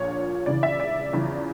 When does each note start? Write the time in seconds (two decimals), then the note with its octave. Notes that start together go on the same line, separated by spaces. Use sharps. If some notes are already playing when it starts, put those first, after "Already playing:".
Already playing: A#1 A#2 F3 C#5
0.46 C#2 C#3 E3 D5
0.63 E5
0.80 D5
1.13 E2 C#3 F3